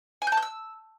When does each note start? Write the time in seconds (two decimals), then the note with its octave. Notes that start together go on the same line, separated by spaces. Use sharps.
0.22 G#5
0.27 G6
0.32 A5
0.37 G6
0.42 E6